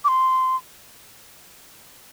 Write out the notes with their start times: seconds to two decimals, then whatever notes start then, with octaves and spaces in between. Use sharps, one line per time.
0.05 D6
0.08 C6